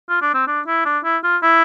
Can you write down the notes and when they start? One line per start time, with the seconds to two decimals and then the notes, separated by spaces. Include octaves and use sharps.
0.09 F4
0.22 D4
0.34 C4
0.48 D4
0.67 E4
0.85 D4
1.04 E4
1.24 F4
1.43 E4